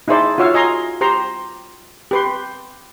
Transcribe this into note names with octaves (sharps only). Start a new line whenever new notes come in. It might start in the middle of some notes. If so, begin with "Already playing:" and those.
D#4 E4 G#4 C5 D5
F4 F#4 C#5 E5 F5
D#5 G#5 A#5 C6
G4 C5 A#5 C6
G4 B4 C6